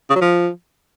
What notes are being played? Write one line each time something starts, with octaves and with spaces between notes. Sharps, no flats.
C#3
F#3
F3